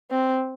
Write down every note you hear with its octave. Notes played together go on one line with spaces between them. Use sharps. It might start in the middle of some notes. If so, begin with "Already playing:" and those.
C4